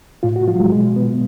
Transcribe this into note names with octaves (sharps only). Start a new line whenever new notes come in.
A2 F4
F#4
F3 F4
F#3
G#3
B2 G#3
B3